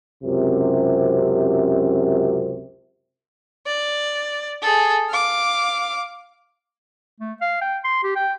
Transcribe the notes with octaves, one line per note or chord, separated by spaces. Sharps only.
C#2 F#2 C3
D5
G#4 A4
F5 D6
A3
F5
G5
C6
G4
G5